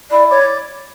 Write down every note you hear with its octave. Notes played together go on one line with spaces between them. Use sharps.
E4 D5
C#5 D5